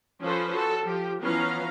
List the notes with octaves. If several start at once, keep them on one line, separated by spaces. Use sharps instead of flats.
F3 C#4 F4 A4 B4 C5
F#4 A4
F3 G4
E3 F3 B3 C#4 F5 A#5